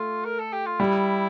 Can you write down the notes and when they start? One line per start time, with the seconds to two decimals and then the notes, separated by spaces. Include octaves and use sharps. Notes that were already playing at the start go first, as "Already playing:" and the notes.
Already playing: A3 F4
0.25 A#4
0.39 A4
0.53 G4
0.66 F4
0.80 G3 E4